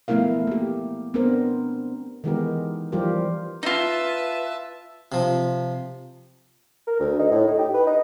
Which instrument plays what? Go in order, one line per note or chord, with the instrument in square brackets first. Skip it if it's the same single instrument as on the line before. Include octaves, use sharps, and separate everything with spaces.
[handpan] F3 A3 B3 E4 A#4 F5
A#3 G4
B3 C4 D4 A#4 C5
D#3 E3 G#3 B3 G4 A#4
E3 F3 G3 F4 G4 A#4
[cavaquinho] D#4 F4 [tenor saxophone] B4 [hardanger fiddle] E5 A5
[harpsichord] C3 F3
[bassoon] A#4
D2
D#4
A2
D#4
G4
B4
D#4